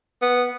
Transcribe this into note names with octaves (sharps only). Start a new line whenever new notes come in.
B3